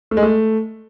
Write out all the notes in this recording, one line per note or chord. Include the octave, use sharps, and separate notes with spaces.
A3
G#3
A3